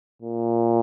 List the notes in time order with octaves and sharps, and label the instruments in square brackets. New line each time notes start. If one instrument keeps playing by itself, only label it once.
[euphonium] A#2